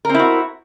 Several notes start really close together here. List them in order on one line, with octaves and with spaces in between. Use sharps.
A#4 C4 E4 F#4